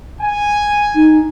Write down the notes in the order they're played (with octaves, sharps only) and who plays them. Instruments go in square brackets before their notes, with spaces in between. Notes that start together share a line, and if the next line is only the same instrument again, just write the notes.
[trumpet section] G#5
[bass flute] D#4